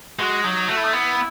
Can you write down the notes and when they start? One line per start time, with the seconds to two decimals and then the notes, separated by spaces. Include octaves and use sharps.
0.19 G#3 F#4
0.43 F#3 D#4
0.68 A3 F#4
0.77 E4
0.85 D#4
0.93 B3 E4